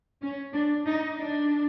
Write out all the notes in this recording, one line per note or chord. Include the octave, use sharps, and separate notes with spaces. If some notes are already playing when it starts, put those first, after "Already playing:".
C#4
D4
D#4
D4